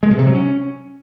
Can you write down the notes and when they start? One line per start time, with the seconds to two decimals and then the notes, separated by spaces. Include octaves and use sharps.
0.03 G#3
0.11 B2
0.19 C3
0.26 F#3
0.34 C#4